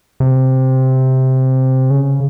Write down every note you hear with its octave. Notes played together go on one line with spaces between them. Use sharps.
C3
C#3